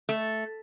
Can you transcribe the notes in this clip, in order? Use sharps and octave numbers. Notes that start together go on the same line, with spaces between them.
A3